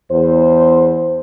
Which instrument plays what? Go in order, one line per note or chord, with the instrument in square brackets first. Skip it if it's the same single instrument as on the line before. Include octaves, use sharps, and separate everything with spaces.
[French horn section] E2 C5